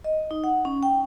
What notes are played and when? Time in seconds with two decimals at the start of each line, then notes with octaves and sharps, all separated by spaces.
0.04 D#5
0.31 D#4
0.44 F#5
0.65 C#4
0.83 G5